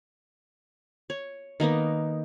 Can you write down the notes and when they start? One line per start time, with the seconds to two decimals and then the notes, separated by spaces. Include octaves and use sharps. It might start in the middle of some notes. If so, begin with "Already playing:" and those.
1.10 C#5
1.60 D#3 A#3 B3 D#4